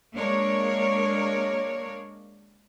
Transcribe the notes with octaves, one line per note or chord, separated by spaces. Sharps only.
G#3 A#3 D4 A#4 C#5